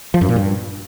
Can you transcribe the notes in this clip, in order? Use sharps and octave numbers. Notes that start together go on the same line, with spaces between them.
F3
F#2
A#2
G2